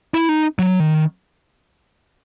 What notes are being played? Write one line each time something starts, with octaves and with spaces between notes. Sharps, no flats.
E4
D#4
F#3
D#3